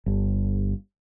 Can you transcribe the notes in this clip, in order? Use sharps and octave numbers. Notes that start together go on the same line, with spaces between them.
G1